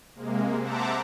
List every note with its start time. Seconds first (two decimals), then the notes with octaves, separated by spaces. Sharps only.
0.16 C3 G#3 A#3
0.59 C5 E5 F#5 A5 A#5 D6